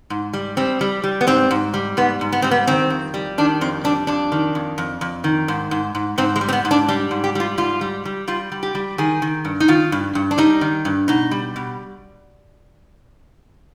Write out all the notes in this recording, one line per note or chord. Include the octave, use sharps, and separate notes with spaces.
G#2
G3
G3 C4
G3
G3
B3
G#2 C4
G#2
G3
G#2 B3
G#2
B3
G3 C4
B3
D#3 C4
F2
G3
D#3 D4
F2 C4
G3 D4
F2 D4
D#3
F2
F2
F2
D#3
G#2
G#2
G#2
G#2 C4
G#3
G3
C4
B3
G#2
D4
G3 D4
G#2
G4
G3 F4
G#2 F4
G3
G3
G3 F4
G3
G4
G3
D#3 G#4
D#3
G2
D#4
D#3 F4
G2
G2
D4
G3 D#4
D#3
G2
B2 D#4
G3
B2